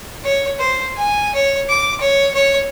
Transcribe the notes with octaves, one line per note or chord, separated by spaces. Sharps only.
C#5
C5
G#5
C#5
D6
C#5
C#5